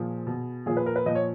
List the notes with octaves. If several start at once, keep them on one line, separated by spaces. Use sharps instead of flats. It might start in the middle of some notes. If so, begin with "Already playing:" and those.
Already playing: A#2 F3 G#4
B2
A#2 F3 G#4
B4
A#4
B4
A#2 F3 D#5
C#5